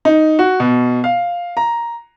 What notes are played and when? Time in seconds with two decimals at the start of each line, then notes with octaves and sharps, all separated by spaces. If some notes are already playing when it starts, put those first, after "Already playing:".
0.05 D#4
0.39 F#4
0.60 B2
1.04 F5
1.57 A#5